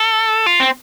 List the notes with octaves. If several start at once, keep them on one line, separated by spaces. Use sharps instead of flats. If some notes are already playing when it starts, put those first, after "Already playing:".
Already playing: A4
F4
C4